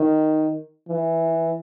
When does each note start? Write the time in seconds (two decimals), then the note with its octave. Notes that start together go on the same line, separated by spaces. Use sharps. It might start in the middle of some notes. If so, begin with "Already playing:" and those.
Already playing: D#3
0.88 E3